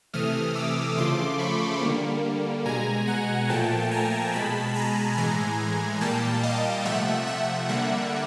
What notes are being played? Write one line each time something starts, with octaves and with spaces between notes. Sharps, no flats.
C3 E3 A3 D#6 F6
D6 E6
C#3 F3 A3 C6 D6
B5 C#6
D3 G3 A#3
B2 G#3 G#5 A#5
F#5 G#5
A#2 F3 A3 G5 A5
G#5 A#5
B2 G#3 A5 B5
G#5 A#5
A2 E3 G#3 G#5 A#5
A#2 G3 A#3 G5 A5
D#5 F5
C3 F3 A3 E5 F#5
E5 F#5
D3 G3 A#3 E5 F#5